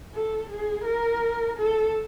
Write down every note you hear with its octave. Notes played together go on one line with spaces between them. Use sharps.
A4
G#4
A#4
A4